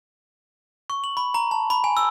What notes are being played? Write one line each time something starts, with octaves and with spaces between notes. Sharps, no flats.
C#6
F#7
B5
A#5
A5
B5
G#5
E6